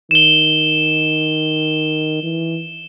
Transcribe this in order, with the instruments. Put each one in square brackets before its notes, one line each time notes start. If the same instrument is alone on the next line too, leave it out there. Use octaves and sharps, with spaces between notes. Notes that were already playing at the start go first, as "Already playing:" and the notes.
[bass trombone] D#3 [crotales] E7 G7
[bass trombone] E3